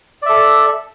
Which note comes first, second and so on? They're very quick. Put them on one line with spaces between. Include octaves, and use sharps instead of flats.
D5 E5 A4